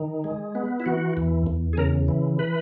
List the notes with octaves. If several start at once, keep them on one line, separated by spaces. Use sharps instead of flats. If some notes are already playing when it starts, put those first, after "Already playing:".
Already playing: D#3
G#3
B3
E4
E3 F#4
E2
E2
G#4
C#3 A#4
E3
B4